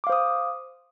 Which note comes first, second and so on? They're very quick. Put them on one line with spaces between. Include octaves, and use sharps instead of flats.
D6 F5 C5 D#6